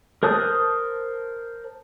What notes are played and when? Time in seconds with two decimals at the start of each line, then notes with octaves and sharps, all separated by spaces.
0.23 A#4 C5 A5 D#6 F#6